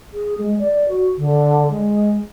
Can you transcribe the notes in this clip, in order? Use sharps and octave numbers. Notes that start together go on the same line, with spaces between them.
G#4
G#3
D5
F#4
D3
G#3